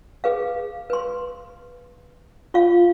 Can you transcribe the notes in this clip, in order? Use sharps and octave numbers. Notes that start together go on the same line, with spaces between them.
G#4 B4 F5
B4 C6
F4 F5